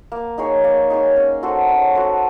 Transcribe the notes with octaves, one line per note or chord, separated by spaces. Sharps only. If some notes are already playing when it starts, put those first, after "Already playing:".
A#3
D#4 G#4 C#5
A#3
D#4 G#4 C#5
C#4
F#4 A4 C5
C#4
F#4 A4 C5